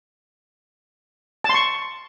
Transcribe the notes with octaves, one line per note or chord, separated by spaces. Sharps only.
A5 C6 C#6